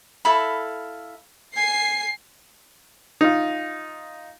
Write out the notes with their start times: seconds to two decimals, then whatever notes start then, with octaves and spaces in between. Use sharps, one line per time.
0.25 E4 A4 F5 B5
1.56 G#5 C7
3.21 D#4 F4